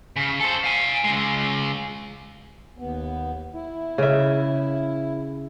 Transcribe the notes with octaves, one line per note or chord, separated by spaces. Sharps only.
C#3
A4 C5
F5 G#5
C#3 G#3
D#2 B3
E4
C#3 E5